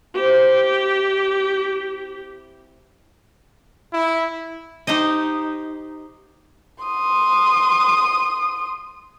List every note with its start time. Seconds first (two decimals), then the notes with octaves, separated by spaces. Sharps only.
0.14 C4 E4 G4 C5
3.93 E4
4.87 D#4 G4 C5 D#5
6.84 C6 D#6